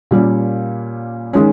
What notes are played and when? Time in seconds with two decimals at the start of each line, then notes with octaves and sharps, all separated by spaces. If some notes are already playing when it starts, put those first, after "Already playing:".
0.11 A#2 G3 A#3 C#4
1.33 D#3 G#3 C#4